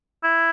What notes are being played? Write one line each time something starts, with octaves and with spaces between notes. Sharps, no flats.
E4